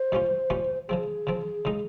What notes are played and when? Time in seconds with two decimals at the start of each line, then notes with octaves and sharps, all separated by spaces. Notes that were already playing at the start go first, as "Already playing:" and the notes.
Already playing: C5
0.12 A#2 G3 C#4 F4
0.50 A#2 G3 C#4 F4
0.88 C#3 F3 C4 G#4
1.27 C#3 F3 C4
1.65 C#3 G#3 D#4